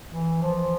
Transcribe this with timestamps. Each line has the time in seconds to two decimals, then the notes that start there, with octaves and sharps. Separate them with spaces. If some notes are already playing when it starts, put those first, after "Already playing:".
0.11 E3
0.42 F3